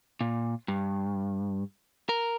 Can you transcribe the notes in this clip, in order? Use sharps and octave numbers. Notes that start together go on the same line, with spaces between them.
A#2
G2
A#4